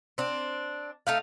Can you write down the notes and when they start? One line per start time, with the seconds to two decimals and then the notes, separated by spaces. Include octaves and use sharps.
0.18 C4 D4
1.07 A3 D#4 F5